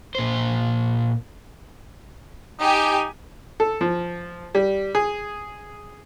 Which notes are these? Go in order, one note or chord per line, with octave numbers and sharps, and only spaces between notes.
A#2 C5
D#4 G4 G#5
A4
F3
G3
G#4